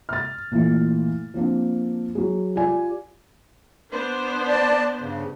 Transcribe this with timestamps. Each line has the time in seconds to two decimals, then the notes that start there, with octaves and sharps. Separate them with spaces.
0.09 F6 A6
0.51 A#2 E3 A3
1.34 F3 A#3 C4 D4
2.15 F#3 G#4
2.55 F4 G4 D5 G#5
3.93 B3 D4 C5
4.48 D5 A5
5.00 G2 C#3